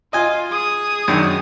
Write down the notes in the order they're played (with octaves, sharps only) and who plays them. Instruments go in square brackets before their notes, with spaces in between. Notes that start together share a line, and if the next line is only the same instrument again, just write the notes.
[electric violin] F4 [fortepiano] D#5 G#5
[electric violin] G#4 D#6
[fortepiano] F#2 D#3 D4